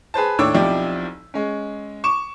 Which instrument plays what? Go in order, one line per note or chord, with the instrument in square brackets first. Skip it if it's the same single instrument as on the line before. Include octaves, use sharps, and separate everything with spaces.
[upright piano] G#4 B4 C5 A5
D#2 A2 D4 C#5 D6 E6
B1 F3 C4 E4 G4 D5
G#3 C#4
C#6 D6 E7